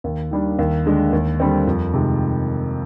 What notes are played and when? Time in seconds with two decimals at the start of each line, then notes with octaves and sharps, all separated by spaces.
0.04 D#2
0.31 D#3 G3 D4
0.59 D#2
0.86 D3 G#3 D4
1.13 D#2
1.40 D3 G3 C4
1.67 F2
1.94 C3 D#3 G#3